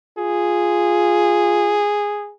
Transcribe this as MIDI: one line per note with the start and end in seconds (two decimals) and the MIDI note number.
0.18 1.87 65
0.18 2.33 68